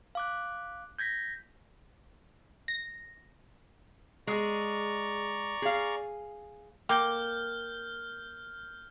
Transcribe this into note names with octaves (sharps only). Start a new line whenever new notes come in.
F5 D6 F#6
G6 G#6 A#6 B6
A#6
G#3 G#4 D5 A#5 C#6
G#4 F5
A#3 G5 D6 F6 G6 G7